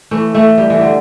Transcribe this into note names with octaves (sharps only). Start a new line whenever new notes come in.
E3 A3
E3 A3
G3
E3
D3